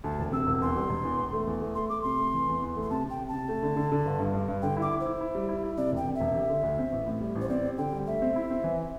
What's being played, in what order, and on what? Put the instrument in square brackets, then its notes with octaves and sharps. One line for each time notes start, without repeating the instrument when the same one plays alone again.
[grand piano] D2 [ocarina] A5
[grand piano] E1
[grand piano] C3 [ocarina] E6
[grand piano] E1
[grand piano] E2 [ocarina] C6
[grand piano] G3
E1
E2
E1
A3
E2
A3
[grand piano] A3 [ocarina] C6
[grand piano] A3 [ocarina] D6
[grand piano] C3 [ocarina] C6
[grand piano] A3
E3
E2
E2
A3
[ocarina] C6
[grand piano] C3 [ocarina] A5
[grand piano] C3
[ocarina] G5
[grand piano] C3
[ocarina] A5
[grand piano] C3
A3
D3
D3
D3
G1
G2
G2
G2
[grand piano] D3 [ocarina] G5
[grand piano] E4
[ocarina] D6
[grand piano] E4
[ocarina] C5
[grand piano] E4
E4
G3
E4
E4
[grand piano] C3 [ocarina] D5
[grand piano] E1
[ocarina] G5
[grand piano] C3
[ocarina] E5
[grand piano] E1
G4
D3
D2
C4
A1
A2
G3
A1
[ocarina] C5
[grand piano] C4 [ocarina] D5
[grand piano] G4
[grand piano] D3 [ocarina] G5
[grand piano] G3
[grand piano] A3 [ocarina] E5
[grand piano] C4
E4
C4
E3